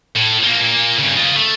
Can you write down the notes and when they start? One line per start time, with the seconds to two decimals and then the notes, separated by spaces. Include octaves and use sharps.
0.16 A2
0.44 F3 A#3
0.61 A#2 A#3
0.99 G2 C#3
1.17 F4 D#5
1.36 A3